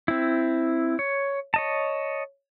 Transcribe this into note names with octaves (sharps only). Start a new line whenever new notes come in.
C4 E4
C#5
C#5 D#5 A5